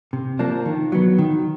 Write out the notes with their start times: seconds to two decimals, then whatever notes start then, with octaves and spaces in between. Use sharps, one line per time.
0.13 C3
0.39 F3 A#3 D4
0.66 D#3
0.92 F#3 B3
1.19 D#3